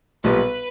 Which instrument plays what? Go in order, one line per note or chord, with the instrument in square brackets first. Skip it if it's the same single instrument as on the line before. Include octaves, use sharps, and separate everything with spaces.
[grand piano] B1 A#2 G3 B3 [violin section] B4